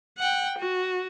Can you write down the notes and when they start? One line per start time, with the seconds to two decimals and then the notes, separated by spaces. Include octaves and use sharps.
0.18 F#5 G5
0.58 F#4